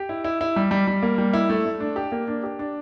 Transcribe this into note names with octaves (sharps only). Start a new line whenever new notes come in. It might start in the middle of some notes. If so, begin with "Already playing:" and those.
Already playing: G4
E4
E4
E4
G3
G3
G3
A#3
G3
E4
A3
A3
D4
G4
A#3
D4
G4
D4